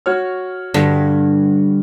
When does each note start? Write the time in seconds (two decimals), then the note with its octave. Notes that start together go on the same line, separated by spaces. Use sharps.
0.06 F#4 C#5 F6
0.74 G2 D3